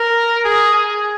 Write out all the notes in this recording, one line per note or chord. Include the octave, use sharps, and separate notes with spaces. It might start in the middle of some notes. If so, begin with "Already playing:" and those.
Already playing: A#4
G#4
G#4